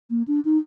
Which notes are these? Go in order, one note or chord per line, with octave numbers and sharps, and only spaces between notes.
A#3
D4
D#4